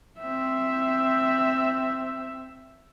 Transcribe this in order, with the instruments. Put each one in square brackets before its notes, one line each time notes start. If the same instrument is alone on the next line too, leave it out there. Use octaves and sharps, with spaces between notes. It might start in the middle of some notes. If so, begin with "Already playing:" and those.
[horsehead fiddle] C4 E5